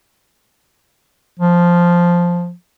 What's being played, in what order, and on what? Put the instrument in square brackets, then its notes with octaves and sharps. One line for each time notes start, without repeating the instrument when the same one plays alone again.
[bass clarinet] F3